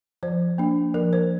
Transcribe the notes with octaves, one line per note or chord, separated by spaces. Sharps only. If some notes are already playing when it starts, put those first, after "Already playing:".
F3 C5
A#3 D4
F3 A#4
C5